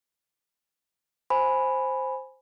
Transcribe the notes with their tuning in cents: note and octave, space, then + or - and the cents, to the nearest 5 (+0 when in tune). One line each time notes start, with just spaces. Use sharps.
C5 +0 G#5 +0 B5 +0